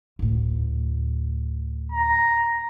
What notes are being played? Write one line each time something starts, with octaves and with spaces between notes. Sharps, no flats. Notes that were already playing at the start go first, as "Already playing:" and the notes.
D2 A2
A#5